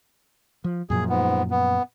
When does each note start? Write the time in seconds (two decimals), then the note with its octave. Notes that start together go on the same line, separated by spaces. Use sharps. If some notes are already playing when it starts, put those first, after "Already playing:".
0.64 F3
0.90 F#2 A#2 F3 G#4
1.09 G#2 B3
1.51 B3